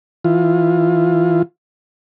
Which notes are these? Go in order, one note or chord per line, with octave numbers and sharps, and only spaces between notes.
E3 F4